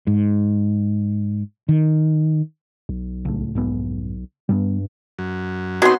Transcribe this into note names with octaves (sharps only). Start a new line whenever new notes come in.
G#2
D#3
B1
C#2 A2
F1 B1 G#2 B3
G2 G3 G#3 B3
F#2
B2 F#3 B3 C4 D#4 C6